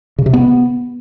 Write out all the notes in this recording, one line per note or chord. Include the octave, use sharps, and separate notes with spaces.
C#3
C3
B3